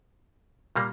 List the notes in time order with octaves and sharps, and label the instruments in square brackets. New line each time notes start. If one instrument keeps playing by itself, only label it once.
[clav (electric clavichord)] A#2 G3 A#3